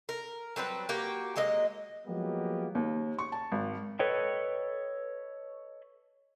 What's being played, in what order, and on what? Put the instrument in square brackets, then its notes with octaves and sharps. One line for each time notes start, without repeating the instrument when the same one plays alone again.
[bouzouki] A#4
F#3 G3 C4 B4
A#3 F#4 G4
F#3 G#3 A#3 D#5
[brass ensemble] F3 F#3 G#3 A#3 B3 G4
[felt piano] D#2
C#6
A5
G#1
[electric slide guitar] A4 B4 C#5 D#5 G5